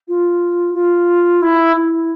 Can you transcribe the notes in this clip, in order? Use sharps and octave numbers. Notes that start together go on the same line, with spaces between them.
F4
F4
E4
E4